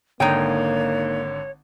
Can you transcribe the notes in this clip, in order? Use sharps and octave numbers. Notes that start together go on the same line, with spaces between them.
G#1 D3 A#3 D#4 C#5 G5 D#7